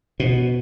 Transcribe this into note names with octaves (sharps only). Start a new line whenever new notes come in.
B2